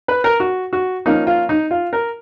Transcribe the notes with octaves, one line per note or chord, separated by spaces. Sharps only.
B4
A#4
F#4
F#4
F3 A#3 C#4 D#4
F4
D#4
F4
A#4